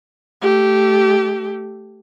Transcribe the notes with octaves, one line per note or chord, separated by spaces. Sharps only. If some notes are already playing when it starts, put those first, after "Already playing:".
A3 G4